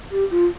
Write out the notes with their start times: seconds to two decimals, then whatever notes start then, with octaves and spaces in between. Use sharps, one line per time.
0.11 G4
0.31 F4